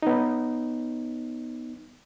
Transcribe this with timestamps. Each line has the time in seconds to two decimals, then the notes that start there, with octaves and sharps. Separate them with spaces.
0.02 B3 D#4